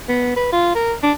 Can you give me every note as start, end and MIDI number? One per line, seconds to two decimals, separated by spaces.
0.09 0.32 59
0.36 0.49 71
0.53 0.73 65
0.75 0.94 70
1.03 1.13 62